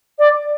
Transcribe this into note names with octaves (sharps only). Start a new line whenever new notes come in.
D5